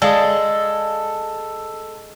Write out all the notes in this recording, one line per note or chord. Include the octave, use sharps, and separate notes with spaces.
G#3 A4 D5 F5 D#6